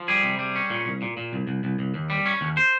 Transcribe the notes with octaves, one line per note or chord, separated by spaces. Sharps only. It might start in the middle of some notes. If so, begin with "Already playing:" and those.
Already playing: F3
G3 G#4
C3
G3
C#4
A#2
C2
A#2
A#2
C2
C2
C2
C2
D#2
G3
C#4
D#2
C5